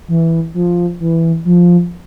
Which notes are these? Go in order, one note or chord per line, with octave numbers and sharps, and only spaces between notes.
E3
F3
E3
F3